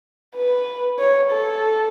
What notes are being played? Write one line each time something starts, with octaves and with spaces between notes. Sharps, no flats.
B4
C#5
A4